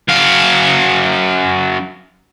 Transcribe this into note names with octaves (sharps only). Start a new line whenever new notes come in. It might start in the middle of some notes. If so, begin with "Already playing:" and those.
F#2 F5